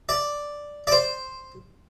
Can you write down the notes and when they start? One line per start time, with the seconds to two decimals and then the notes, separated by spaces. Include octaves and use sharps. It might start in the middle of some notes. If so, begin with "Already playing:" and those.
0.09 D5
0.87 D5
0.92 C5